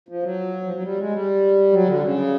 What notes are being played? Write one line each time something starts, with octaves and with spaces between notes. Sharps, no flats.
F3
F#3
F3
F#3
G3
G#3
G3
F#3
D3
C#3